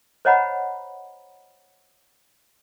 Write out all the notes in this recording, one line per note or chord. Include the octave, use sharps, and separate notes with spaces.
C5 C#5 D#5 F#5 A#5 B5